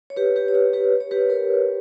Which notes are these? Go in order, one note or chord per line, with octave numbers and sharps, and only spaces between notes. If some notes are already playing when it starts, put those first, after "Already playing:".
C#5
G4 B4
G4 B4
C#5
G4 B4
G4 B4
C#5
G4 B4
A#4 C#5